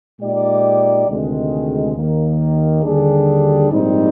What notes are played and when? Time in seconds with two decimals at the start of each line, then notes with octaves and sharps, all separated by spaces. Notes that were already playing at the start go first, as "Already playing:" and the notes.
0.20 A#2 G#3 D#4 G4 D5
1.07 D2 C3 D#3 G#3
1.95 D#2 D#3 A#3
2.83 D#2 D3 G3 D4 G#4
3.70 A#1 G#2 G3 C4 D#4